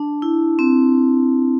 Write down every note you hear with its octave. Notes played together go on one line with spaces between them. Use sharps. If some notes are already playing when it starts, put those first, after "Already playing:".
Already playing: D4 A5
E4
C4